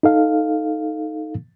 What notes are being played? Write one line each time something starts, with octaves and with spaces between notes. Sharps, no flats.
D#4 A4 F5